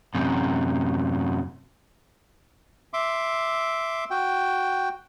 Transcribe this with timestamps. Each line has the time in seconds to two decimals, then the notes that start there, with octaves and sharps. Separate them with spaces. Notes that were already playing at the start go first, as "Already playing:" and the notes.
0.15 F#2 C3
2.93 E5 C6 D6
4.10 F#4 G5